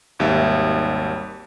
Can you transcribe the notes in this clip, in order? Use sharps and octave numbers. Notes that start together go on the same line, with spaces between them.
G#1 D#2 G3 E5